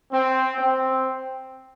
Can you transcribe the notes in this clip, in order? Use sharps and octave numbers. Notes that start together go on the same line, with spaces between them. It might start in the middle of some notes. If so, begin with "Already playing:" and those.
C4
C4